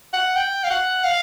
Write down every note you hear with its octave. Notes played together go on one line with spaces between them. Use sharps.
F#5
G5
F5
F#5
F5